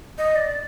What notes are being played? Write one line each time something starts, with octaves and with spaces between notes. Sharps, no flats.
D#5
D5